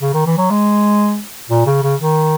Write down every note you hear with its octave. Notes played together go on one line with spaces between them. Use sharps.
C#3
D#3
E3
F#3
G#3
A#2
C#3
C#3
D#3